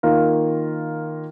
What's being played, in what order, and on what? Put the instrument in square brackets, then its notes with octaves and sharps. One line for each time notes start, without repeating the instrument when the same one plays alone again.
[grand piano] D#3 A#3 F4 A#4